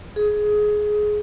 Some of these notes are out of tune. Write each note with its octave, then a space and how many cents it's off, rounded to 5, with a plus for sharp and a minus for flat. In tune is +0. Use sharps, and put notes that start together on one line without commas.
G#4 +15